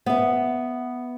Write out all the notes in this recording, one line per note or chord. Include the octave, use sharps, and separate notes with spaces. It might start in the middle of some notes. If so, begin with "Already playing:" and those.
B3 E5